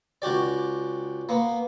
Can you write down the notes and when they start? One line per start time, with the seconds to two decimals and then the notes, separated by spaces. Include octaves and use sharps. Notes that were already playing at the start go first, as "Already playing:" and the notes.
0.22 C#2 F#4 G4 D5
1.29 A#3 B3